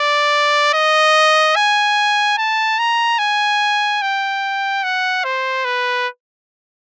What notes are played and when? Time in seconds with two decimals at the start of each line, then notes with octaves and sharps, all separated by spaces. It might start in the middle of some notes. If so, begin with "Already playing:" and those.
Already playing: D5
0.74 D#5
1.56 G#5
2.38 A5
2.79 A#5
3.19 G#5
4.02 G5
4.84 F#5
5.24 C5
5.65 B4